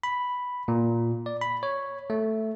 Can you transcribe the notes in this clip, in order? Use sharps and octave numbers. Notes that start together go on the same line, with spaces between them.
B5
A#2
D5
B5
C#5
A3